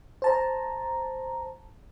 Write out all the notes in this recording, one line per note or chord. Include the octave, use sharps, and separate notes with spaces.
C5 A5 A#5